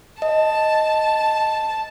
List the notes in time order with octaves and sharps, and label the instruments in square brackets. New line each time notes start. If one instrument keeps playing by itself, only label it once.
[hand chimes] D#5 [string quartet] A5